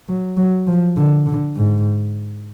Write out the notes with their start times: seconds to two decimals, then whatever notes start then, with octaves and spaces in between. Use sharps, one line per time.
0.08 F#3
0.37 F#3
0.67 F3
0.96 D3
1.26 D3
1.55 G#2